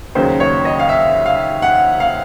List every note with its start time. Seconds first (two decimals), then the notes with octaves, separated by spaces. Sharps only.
0.15 D#2 C#3 F#3 C5
0.40 C#5
0.65 D#5
0.79 F5
0.89 E5
1.26 F5
1.62 F#5
2.00 F5